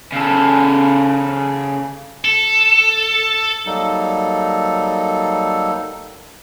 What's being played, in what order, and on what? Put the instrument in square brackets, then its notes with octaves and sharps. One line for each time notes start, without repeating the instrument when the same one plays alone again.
[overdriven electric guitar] C#3 A4
[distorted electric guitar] A4
[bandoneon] F#3 G3 A#3 D#4 A4